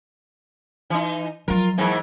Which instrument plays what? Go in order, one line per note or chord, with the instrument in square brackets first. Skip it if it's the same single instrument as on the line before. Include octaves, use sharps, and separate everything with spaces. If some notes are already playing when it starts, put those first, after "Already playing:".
[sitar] E3 D#4
[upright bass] F3 F#3 [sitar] F4 A#4
[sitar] G#2 E3 A#3